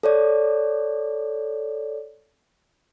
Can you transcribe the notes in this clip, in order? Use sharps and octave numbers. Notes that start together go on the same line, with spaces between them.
A4 C#5 D5